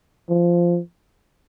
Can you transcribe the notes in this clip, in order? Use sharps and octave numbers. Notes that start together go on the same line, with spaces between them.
F3